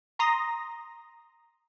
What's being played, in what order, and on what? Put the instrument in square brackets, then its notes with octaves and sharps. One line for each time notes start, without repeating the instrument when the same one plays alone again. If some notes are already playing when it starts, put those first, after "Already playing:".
[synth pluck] A#5 C6 D#6 A#6